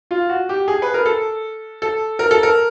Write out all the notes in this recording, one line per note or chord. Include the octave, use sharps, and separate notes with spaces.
F4
F#4
G4
G#4
B4
A#4
A4
A4
A#4
A4
A#4